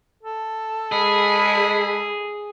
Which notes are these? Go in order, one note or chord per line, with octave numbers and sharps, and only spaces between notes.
A4
G#3 G#4 B5